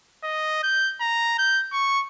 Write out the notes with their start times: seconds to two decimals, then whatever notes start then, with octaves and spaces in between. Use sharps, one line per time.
0.24 D#5
0.63 G6
1.01 A#5
1.39 G6
1.73 C#6